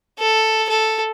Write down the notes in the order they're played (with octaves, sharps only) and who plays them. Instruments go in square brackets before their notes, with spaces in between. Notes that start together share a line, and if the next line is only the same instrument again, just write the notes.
[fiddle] A4
A4